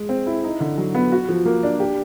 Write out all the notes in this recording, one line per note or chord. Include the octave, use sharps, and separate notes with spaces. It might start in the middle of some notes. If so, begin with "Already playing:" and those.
Already playing: G#3 G#4
C4
E4
D#4
D3
F#3
B3
F#4
F3
A#3
D4
G4